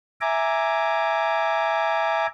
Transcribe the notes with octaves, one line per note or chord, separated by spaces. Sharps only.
E5 G#5 A#5 D6